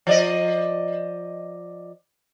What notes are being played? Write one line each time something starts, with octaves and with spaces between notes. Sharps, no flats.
F3 D5 D#5